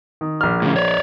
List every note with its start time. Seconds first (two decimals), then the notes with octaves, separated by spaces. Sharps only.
0.21 D#3
0.41 A#1 F6
0.62 A2 D3 C#4
0.76 C#5 D5